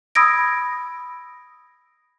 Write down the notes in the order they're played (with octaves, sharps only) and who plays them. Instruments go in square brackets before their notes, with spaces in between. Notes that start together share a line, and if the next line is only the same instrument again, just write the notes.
[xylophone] B5 D#6 E6 G#6 A#6 D7